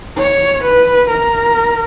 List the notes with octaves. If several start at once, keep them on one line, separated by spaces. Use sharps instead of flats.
C#5
B4
A#4